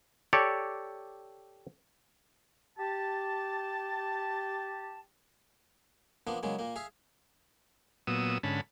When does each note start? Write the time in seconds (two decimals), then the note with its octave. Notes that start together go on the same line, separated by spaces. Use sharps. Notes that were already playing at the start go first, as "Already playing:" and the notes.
0.33 G4 A4 C#5 D5
2.78 G4 A5
6.27 F3 A#3 B3 D4
6.43 C#3 F#3 G#3 A#3
6.59 A#2 A#3
6.76 G#4 E5 F5
8.07 A#2 F#3 B3 D#6 E6
8.43 G#2 D3 C#4 A5 B5